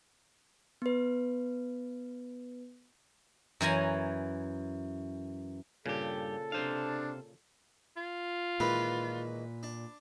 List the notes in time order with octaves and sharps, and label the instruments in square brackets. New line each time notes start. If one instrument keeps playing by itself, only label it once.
[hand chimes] B3 B4
[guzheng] F#2 E3 G#5 A#5
[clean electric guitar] G2 G4 [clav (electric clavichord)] A#2 C#3 [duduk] A4
[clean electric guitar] C3 C5 F5 [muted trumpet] D4
[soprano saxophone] F4
[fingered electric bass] A#2 [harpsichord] D#3 E3 G#3 [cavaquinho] B4
[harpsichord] D4